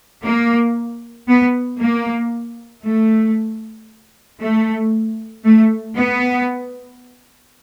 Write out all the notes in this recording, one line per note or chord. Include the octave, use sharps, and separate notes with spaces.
A#3
B3
A#3
A3
A3
A3
B3